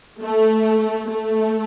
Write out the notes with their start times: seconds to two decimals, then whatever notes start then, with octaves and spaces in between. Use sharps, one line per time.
0.22 A3
1.07 A3